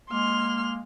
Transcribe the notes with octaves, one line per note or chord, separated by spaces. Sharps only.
G#3 A#3 C6 F6